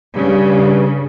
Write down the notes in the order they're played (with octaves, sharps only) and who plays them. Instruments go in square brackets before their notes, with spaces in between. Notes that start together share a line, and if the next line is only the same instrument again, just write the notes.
[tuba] G2 [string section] C#3